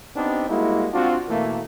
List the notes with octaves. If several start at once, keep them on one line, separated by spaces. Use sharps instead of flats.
B3 C4 D4 D#4 G4
G3 G#3 A#3 E4 F#4
C4 D4 F4 F#4
B2 E3 A3 A#3